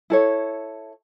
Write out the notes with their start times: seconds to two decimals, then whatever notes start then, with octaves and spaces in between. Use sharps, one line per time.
0.10 E4 A4 C#5